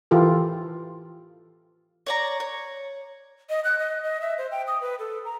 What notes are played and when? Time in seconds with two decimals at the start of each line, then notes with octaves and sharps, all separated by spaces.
0.11 E3 F4 G4 A4
2.06 C#5 D5 A#5
2.40 C#5
3.50 D#5
3.64 F#6
3.79 D#5
4.03 D#5
4.21 E5
4.38 C5
4.51 G5
4.67 D#6
4.81 B4
4.99 A4
5.25 A#5